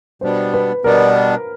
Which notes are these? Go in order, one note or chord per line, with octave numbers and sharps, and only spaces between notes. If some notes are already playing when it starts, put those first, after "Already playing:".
B2 G3 B3 D4 C5
B4
B2 G3 B3 D4 A#4